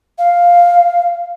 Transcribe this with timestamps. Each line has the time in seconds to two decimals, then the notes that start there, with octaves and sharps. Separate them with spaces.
0.18 F5